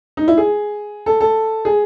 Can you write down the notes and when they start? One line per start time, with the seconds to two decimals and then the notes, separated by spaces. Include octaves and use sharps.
0.17 D#4
0.28 E4
0.38 G#4
1.06 A4
1.21 A4
1.65 G#4